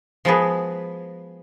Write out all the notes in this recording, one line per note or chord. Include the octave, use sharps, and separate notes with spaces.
F3 G#3 B3 F#4 G#4 B4